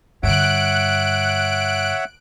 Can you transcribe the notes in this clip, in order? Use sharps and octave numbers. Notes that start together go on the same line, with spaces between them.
G2 D3 C#5 E5 F#5 F#6 D7